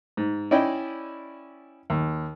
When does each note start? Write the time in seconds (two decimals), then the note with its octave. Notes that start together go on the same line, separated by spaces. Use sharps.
0.17 G#2
0.51 C#4 E4 D5 D#5 G5
1.90 D#2